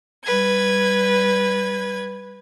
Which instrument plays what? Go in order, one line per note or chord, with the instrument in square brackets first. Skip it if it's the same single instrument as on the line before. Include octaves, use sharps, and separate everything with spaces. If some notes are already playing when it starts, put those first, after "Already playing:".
[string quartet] G3 B4 G#6